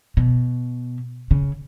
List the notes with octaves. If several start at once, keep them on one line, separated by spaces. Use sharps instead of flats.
B2
C#3